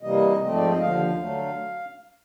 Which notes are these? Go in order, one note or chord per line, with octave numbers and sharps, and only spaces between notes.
C3 E3 G3 A#3 D#5
G#2 F3 A3 C4 D#5
D5
D#5
D#2 D3 F3 F5
D3 F#3 A3